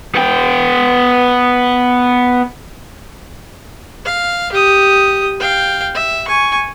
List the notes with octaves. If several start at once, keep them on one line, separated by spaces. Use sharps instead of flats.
B3 G5
F5
G4 D#6
F5 G5
E5
G#5 C#6